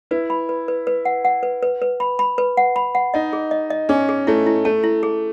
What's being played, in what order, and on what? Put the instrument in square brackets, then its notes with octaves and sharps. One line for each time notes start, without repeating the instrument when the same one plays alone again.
[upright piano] E4 [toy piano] B4
[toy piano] B5
B4
B4
B4
F#5
F#5
B4
B4
B4
B5
B5
B4
F#5
B5
F#5
[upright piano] D#4 [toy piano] D#5
[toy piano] G#4
D#5
D#5
[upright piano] C#4 [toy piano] G#4
[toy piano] G#4
[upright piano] A3 [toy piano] E4
[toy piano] E4
[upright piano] A3 [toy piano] A5
[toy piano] E4
G#4